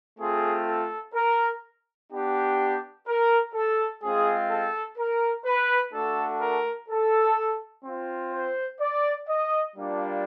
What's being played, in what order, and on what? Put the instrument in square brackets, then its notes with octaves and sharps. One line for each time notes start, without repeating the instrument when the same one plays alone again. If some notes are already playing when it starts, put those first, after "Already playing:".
[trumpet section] A3 C4 F4 G#4
A4
A#4
B3 D4 G4
A#4
A4
G#3 C4 F4 G#4
A4
A#4
B4
A3 D4 F#4 A4
A#4
A4
C4 F4
C5
D5
D#5
G3 A#3 D4 F4